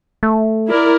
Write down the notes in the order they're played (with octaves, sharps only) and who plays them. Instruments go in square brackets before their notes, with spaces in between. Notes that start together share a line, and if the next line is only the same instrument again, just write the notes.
[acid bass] A3
[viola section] E4 A#4 D5